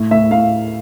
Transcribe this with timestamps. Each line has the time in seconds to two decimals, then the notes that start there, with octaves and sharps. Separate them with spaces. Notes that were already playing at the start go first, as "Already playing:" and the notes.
Already playing: A2
0.11 A2 E5
0.31 A2 F5